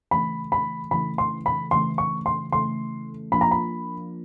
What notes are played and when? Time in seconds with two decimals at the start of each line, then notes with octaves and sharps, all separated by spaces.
0.11 C#3 E3 A3 B5
0.52 B5
0.91 C#3 E3 A3 B5
1.18 C6
1.46 B5
1.71 C#3 E3 A3 C6
1.98 C#6
2.26 C6
2.52 C#3 E3 A3 C6
3.32 F3 A#3 D4 F4 B5
3.41 A#5
3.51 B5